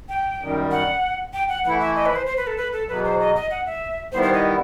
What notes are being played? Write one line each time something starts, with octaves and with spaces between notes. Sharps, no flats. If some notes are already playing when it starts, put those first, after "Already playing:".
G5
F#2 D#3 G3
F#5
G5
F#5
E3 A3 E4 F#5
E5
D#5
B4
C5
C5
B4
A4
B4
A4
E2 B2 F#3 B4
C5
D#5
D#5
F#5
E5
D#3 G3 B3 E4 C5
C5
D#5